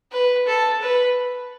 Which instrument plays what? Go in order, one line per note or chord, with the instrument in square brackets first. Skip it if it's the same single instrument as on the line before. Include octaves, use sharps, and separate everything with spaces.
[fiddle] B4
A4
B4